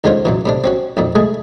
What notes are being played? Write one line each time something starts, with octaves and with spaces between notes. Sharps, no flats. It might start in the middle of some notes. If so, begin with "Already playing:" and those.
D#2 D3 G#3 C#4 F4 C5
F#2 A#2 E3
A2 C3 D4
C4 C#4 F#4
B1 F2 A#2
G#3 A3 G#4